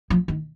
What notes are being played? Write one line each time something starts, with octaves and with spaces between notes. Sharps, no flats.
F3
D#3